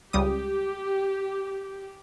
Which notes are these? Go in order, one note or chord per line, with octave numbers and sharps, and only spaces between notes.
C#2 G3 G4 D#6